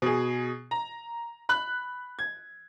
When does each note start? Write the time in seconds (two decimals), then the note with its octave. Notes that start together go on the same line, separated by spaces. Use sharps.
0.02 B2 G#4
0.71 A#5
1.49 B5 F#6
2.19 G#6